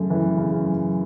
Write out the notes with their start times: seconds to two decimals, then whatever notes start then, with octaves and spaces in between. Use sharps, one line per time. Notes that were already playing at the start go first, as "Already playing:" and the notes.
Already playing: F#2 C#3 A3
0.10 E3
0.37 C#3
0.64 F#2